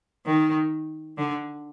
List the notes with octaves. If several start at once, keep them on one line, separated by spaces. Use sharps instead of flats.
D#3
D3